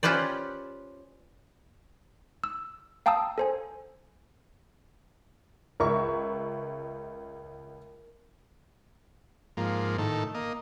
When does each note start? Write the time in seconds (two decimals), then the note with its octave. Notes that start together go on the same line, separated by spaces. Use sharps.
0.03 C#4 F4 G4 B4 C5 D5
2.44 E6
3.06 F5 G5 A5 A#5 D#6 E6
3.38 A4 C5 G#5
5.80 C#2 A#4 E5 C#6
9.57 G#2 F3 A#3
9.98 A2 D#3 A4
10.35 A#3 D#5